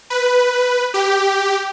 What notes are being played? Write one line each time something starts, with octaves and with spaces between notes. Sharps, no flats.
B4
G4